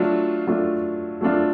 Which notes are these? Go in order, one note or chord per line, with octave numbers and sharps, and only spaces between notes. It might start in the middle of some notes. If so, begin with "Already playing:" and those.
Already playing: F#3 A3 D4 F4
F#3 A3 D4 F4
F#3 A3 D4 F4